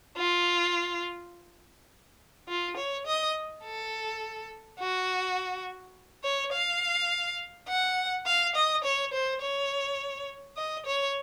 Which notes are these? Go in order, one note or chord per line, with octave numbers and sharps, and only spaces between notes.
F4
F4
C#5
D#5
A4
F#4
C#5
F5
F#5
F5
D#5
C#5
C5
C#5
D#5
C#5